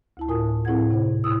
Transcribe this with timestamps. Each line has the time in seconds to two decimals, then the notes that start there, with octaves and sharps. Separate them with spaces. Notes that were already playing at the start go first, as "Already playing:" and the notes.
0.17 D2 E4 A5
0.28 A2 F4 A#4 G#5 D#6
0.65 A2 C4 E4 G#4 F#5 G#6
0.91 C3 E4 C5
1.07 G#2
1.24 A#2 E4 D#6 E6